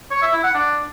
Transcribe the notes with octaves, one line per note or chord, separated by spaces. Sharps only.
C#5
E5
E4
F#5
D4